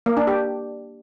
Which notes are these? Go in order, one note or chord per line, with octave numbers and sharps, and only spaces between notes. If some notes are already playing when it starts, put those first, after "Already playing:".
A#3
D4
G4